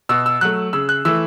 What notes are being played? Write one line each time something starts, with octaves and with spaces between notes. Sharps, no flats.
B2 E6
E6
F#3 A3 F#6
C#3 E6
F#6
E3 A3 E6